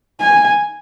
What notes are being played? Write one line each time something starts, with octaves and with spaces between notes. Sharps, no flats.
G#5